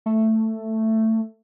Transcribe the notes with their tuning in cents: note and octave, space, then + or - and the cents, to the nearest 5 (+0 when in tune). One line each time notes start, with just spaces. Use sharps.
A3 +10